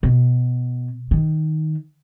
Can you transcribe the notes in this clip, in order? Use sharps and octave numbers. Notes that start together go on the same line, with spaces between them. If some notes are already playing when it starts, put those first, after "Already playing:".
B2
D#3